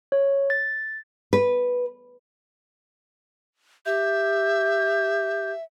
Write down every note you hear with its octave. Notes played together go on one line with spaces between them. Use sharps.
C#5
A6
B4
G4 E5 G6